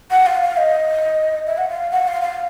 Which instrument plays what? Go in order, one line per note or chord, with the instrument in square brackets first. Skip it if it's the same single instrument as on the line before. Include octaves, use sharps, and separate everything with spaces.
[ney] F#5
F5
F5
D#5
E5
F#5
F5
F#5
F5
F5